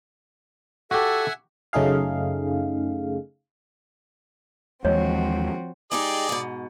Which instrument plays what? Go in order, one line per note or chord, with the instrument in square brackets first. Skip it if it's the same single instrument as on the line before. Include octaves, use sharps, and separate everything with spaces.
[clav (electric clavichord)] F#4 G4 [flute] A4 [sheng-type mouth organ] E5 F#5 G#5
[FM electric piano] F#2 C#3 A3 D#4 G#4 F5
[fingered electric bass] D#2 E3 G#3 [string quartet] F3 C4 F#4 [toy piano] C#5 D#5
[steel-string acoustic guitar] G#3 D#4 G4 [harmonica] G#4 D5
[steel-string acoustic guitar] G#2 B2